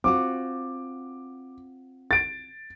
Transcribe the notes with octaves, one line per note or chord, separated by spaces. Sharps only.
C4 F4 F#4 D6
A6 D7